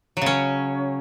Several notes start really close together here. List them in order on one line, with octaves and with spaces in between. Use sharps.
F#3 C#3 C#4